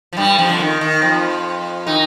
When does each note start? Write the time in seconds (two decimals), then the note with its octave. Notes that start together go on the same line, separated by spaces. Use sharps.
0.13 F3
0.17 G2 G3
0.39 F2 F3
0.49 D3
0.60 D#3
0.81 D#3
1.02 F2 F3
1.87 D#3 D#4